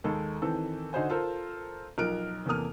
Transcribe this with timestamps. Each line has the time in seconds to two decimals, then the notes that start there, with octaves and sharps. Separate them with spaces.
0.04 D#2 D#3 G#3 A4
0.42 D#3 E3 C4 A4
0.93 D3 D#4 F#4 C5 G#5
1.10 F4 A4 A#4 C5
1.98 B1 F3 A#4 F6 F#6 D7
2.46 E2 C3 A#3 A4 D#6 F6